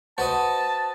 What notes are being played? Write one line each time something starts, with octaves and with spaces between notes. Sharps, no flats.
F#4 B4 C5 D#5 A5